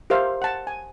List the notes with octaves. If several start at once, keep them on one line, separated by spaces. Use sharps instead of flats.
G4 A#4 C5 E5 F5
F#5 A5
G#5